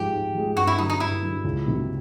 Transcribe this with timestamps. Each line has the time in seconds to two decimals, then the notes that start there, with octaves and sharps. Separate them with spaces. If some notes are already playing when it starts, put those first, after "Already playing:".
Already playing: G#2 F3 G#3 G4
0.13 G#2
0.34 F3 G#3
0.56 G2 F#4
0.67 E4
0.79 D3 F#3 D#4
0.90 D#4
1.00 G2 E4
1.22 D3 F#3
1.45 C#2
1.66 C3 D#3 F#3 A#3